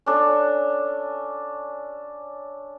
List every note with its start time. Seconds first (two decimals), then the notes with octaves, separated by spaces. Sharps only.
0.06 C#4 D4 A4